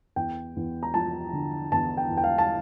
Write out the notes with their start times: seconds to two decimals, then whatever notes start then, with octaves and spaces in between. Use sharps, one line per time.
0.16 E2 G5
0.56 E2
0.83 A#5
0.94 F3 A5
1.33 D3
1.72 E2 A5
1.97 G5
2.10 E2
2.17 G5
2.24 F5
2.38 A5